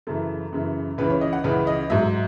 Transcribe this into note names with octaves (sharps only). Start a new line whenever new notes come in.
F#2 C#3 E3 A4
F#2 C#3 E3
C#2 C#3 E3 B4
C#5
D#5
F#5
C#2 C#3 E3 B4
D#5
G#2 F#3 E5